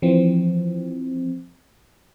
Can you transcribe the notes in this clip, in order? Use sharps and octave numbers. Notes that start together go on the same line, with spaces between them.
E3 F3 C4